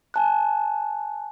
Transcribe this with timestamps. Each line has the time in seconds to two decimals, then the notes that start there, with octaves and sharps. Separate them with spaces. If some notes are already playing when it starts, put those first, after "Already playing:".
0.14 G#5 A5 F#6